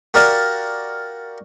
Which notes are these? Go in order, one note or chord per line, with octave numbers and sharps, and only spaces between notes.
F#4 G4 A#4 D5 F5